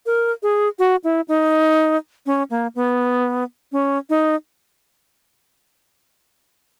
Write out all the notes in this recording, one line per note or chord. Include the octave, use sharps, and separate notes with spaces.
A#4
G#4
F#4
E4
D#4
C#4
A#3
B3
C#4
D#4